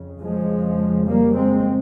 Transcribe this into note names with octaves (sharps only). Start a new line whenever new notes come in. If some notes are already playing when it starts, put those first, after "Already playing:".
Already playing: F2 C#3
F3 G#3
G3 A#3
G#3 C4